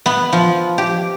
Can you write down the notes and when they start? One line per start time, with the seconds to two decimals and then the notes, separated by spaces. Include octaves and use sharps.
0.06 B3
0.33 F3
0.78 G4